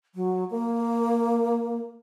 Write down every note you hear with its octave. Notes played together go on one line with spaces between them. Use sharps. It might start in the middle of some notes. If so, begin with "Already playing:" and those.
F#3
A#3